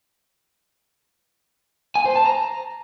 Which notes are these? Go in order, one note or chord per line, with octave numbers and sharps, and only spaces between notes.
G#5
C5
A5
A#5